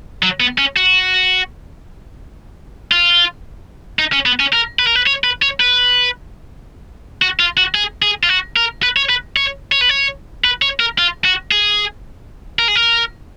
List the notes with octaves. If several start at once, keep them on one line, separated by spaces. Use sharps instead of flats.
F#3
B3
C#4
F#4
F4
D#4
C#4
B3
C#4
A#4
B4
A#4
B4
C#5
B4
C#5
B4
F#4
F4
F#4
G#4
G#4
F4
F#4
A#4
B4
C#5
B4
C#5
C#5
B4
C#5
B4
C#5
A#4
F4
F#4
G#4
A#4
G#4
A#4